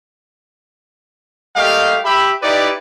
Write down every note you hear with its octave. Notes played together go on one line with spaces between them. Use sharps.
G3 A3 A#3 G4 D#5 F5
G4 E5 B5
D#4 E4 G4 B4 D5